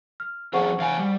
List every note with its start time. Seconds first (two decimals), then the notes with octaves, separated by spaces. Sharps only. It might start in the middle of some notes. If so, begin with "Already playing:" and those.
0.20 F6
0.53 F2 C4 G#4 C5 F#5 C#6
0.78 E2 F5 G#5
0.99 G3